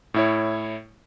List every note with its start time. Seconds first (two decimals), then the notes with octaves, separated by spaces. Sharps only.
0.14 A2 E4 C#5